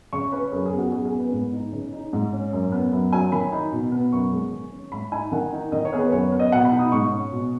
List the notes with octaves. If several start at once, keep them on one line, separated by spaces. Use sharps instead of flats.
C#3 C#6
C#4 B4
F#2 G#4
G#4
B3
F#4
F#2 G#4
G#4
B3
B4
G#2
D#4
C#3
D#4
G#2
C#4
F#2
B3
F#2
F#3 G#5
D#3 B5
D#4
B2
B3
F#2 C#6
G#3
D#3
C#4
G#2 B5
D#4 G#5
D#3 F#5
D#4
D#3 D#5
C#5
B3 G#4
B4
F#2 C#5
B3
D#5
B2 F#5
B5
D#4
D#6
G#2 C#6
C#4
B2